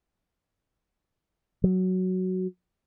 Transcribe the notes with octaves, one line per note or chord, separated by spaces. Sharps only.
F#3